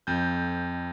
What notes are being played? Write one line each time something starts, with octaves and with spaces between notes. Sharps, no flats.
F2 G6